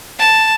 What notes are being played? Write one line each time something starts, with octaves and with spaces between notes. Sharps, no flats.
A5